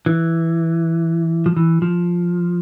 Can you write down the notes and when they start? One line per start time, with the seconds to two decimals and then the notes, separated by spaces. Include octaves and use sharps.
0.06 E3
1.46 F3
1.57 E3
1.82 F3